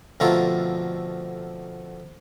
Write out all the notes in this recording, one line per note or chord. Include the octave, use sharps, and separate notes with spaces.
F2 B2 D3 A3 F4 A#5